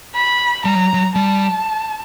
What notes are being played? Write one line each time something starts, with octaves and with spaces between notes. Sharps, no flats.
B5
G3 A#5
F#3
F#3
G3 A5